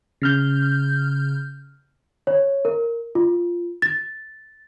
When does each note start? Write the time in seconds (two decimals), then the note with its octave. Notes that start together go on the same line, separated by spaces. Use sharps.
0.22 C#3 F6 G6
2.27 C#5
2.65 A#4
3.15 F4
3.82 A6